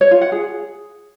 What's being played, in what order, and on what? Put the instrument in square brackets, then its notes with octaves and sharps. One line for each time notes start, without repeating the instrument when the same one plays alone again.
[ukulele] C#5
F4
F#5
G#4